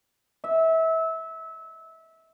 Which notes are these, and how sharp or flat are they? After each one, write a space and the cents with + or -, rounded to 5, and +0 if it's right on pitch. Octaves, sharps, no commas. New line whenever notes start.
E5 -25